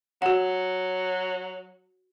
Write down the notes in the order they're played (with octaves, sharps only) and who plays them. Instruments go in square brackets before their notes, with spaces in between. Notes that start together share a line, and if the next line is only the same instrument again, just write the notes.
[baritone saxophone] F#3 [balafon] F#4 F#5